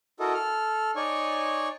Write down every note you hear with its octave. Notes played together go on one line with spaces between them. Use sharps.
E4 F#4 A4 A#4 D#5
A4 F6
D#4 C#5 D5 G#5 C#6